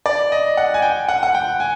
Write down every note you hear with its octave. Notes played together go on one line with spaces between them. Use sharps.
D5
D#5
F#5
G#5
G5
F#5
F#5
G5
G#5